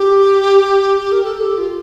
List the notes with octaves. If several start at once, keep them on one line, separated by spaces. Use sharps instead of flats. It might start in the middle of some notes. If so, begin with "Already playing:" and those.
Already playing: G4
A#4
A4
G4
F4